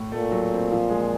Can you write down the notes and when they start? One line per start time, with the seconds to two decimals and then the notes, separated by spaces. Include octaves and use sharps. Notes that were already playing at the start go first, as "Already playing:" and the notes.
Already playing: A2
0.12 A#2 A3
0.31 F#3
0.52 C4
0.71 F3
0.89 G#3